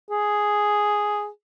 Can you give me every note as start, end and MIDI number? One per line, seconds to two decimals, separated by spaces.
0.11 1.28 68